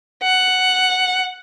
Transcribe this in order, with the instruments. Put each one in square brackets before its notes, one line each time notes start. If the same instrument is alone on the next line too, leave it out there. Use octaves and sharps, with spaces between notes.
[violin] F#5